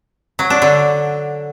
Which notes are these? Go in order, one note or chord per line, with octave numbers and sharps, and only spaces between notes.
F#3
D4
D3